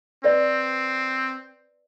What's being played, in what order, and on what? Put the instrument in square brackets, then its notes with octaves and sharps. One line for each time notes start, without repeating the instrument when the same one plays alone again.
[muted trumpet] C4 [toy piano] B4 D5